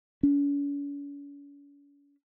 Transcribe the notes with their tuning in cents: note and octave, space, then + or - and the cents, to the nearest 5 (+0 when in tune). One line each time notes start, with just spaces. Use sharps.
C#4 +45